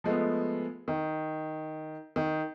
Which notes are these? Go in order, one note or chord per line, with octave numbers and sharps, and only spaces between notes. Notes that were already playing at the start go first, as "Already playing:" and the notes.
F3 G#3 A3 B3
D#3
D#3